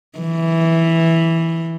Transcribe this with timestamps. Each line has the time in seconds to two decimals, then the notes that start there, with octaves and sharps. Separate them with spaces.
0.19 E3